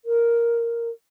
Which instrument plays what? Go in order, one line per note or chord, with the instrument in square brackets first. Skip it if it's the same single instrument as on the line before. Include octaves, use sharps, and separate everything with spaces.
[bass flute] A#4